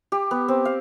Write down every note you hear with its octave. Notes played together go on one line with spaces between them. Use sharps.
G4
B3
C4
F5